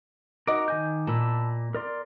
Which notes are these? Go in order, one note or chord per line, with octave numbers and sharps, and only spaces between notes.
D#4 F#4 A#4 D#5 D6
D#3 G#5 G6
A#2 A5 B5 E6
A#4 D5 C6